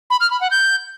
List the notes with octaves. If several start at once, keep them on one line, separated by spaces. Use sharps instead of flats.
B5
F6
B5
F#5
G6